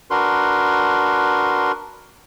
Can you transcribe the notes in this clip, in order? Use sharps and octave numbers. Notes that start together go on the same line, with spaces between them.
D4 F#4 A#4 B4 C6